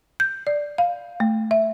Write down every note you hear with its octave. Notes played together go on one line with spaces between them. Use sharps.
G6
D5
F5
A3
E5